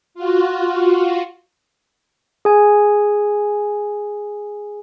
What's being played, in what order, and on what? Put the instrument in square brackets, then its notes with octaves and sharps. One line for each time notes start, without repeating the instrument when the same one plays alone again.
[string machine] F4 F#4
[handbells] G#4 G#5